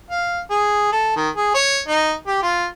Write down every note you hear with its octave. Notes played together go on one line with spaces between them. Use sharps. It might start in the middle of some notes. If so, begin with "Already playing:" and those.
F5
G#4
A4
D#3
G#4
C#5
D#4
G4
F4